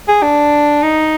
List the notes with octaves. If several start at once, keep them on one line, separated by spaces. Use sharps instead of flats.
G#4
D4
D#4